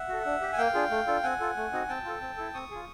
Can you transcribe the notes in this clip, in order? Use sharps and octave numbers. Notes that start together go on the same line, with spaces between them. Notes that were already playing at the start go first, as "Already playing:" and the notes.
Already playing: E5 F#5
F#4 A4
D4
G4
G#5
A#3 F5 G5
D4 F4 G#4
A3
D4 F4 A4
C4 F#5 G#5
F4 A4
A3
C4 D#4 F#4
C4 G5 A5
F4 A4
C4
E4 A4
C4 C#6 D#6
F4 G#4